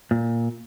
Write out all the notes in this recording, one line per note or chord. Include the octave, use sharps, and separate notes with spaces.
A#2